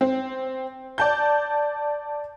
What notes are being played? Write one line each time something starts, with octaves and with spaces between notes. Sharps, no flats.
C4
D5 A5 G6